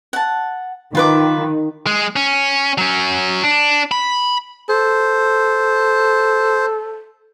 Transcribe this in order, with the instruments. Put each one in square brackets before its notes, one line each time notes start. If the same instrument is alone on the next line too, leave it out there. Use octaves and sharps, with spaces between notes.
[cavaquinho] F#5 A5
[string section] D#3 [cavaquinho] F4 B4 D6
[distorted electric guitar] G#3
C#4
F#3 C#4
D4
B5
[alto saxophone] A4 [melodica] C5